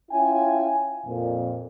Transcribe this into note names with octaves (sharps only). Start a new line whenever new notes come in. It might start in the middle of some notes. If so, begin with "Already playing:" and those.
C#4 E4 F4 G5 G#5
F2 A#2